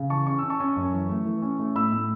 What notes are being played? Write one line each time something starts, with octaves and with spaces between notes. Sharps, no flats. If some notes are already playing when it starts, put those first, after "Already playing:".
Already playing: C#3
E3 A5 C#6
C#4 C#6
C#4 E6
A5 C#6
C#4
F#2
E3
A3
E3
C#4
A3
A2 B5 E6
A2